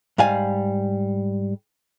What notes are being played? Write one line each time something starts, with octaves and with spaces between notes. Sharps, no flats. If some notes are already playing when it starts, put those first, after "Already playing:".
G#2 G3 F5 G#5